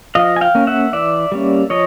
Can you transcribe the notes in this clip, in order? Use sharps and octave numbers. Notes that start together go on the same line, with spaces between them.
F3 D#5 F5
G#5
F5 G5
A#3 C#4
E5 F#5
E3 D5 E5
G3 A#3 C#4
F3 C#5 D#5